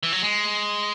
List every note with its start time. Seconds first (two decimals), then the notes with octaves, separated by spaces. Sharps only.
0.03 E3
0.13 F#3
0.22 G#3